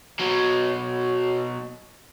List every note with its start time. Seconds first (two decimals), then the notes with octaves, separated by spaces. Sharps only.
0.19 B2 F#3